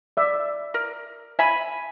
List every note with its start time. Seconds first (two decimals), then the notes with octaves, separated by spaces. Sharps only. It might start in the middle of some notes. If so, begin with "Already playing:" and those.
0.17 D5 E5
0.74 A#4
1.39 E5 G#5 B5